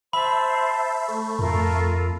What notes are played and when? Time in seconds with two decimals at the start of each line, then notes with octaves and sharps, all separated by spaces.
0.13 C5 E5 A5 B5 C6
1.08 A3
1.39 F2 F4 A4 A#4